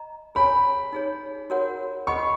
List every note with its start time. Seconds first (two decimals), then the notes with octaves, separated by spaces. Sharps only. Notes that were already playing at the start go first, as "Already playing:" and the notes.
Already playing: D#5 A#5
0.35 G#4 C#5 G#5 B5
0.93 D#4 G#4 C#5
1.50 F#4 A#4 C#5 F#5
2.07 G#4 D#5 F#5 B5 C#6